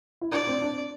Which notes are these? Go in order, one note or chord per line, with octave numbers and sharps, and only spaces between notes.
E4
D4 D5
C4
D4